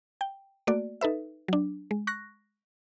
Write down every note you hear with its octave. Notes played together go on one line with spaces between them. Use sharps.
G5
A3 A#3 F#4 D5
D#4 A4 B4 E5
F#3 D4
G#3
C#6 F#6 A#6